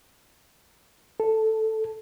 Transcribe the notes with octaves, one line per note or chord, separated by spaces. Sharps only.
A4